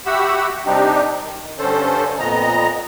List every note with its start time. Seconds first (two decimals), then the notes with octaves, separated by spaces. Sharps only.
0.06 F#4 G4 E5 F#5 B5 E6
0.66 C3 G3 C4 D4 D#4 G4
1.24 D#3
1.59 G2 D3 C#4 A4 C5
2.19 F2 A#2 B3 D#5 A#5